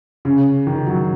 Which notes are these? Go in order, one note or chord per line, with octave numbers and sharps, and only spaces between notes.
C#3
D#3
F#3